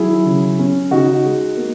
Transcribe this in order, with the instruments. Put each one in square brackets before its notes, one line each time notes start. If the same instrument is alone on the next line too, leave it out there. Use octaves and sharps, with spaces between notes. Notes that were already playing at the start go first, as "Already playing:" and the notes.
Already playing: [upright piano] D#3 F#3 E4 G#4
C#3
C#4
C#3 D#4 F#4
G#3
A#3